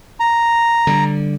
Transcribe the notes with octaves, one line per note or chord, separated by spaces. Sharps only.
A#5
D3 G3